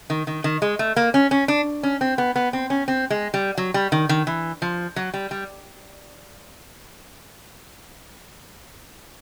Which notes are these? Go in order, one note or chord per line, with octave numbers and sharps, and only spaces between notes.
D#3
D#3
D#3
G#3
A3
A#3
C#4
C#4
D4
C#4
C4
B3
B3
C4
C#4
C4
G#3
G3
F#3
G3
D#3
D#3
E3
F3
F#3
G3
G3